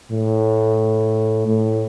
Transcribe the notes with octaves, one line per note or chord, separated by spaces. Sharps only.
A2
A2